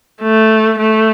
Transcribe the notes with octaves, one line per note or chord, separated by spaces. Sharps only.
A3
A3